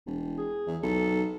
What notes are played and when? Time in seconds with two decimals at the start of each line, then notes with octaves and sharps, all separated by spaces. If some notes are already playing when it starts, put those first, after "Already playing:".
0.06 E1
0.38 G#4
0.67 E2
0.83 B1 A4